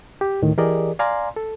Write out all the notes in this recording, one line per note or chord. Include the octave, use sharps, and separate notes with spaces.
G4
D2 A2 D#3
E3 G4 G#4 A#4 D5 D#5
D5 F5 G#5 A#5 C6
A4